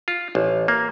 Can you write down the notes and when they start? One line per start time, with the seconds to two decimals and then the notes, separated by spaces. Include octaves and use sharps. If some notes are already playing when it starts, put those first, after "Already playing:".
0.08 F4
0.35 A1
0.68 A#3